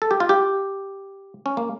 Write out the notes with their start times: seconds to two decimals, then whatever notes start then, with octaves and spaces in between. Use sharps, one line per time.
0.02 A4
0.11 G4
0.20 F4
0.29 G4
1.46 C#4
1.57 A#3